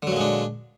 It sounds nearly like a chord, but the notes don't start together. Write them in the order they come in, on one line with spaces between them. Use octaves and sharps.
D3 F#3 A#2 G#3 D4